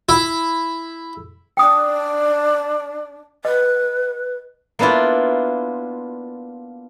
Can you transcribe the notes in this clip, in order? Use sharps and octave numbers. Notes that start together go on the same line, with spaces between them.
E4
D4 G5 D#6
B4 D#5
A#3 B3 D4 E4 F4